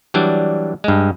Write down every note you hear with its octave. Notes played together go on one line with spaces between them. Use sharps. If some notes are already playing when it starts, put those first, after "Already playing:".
E3 F#3 G3 D4
G2 G#3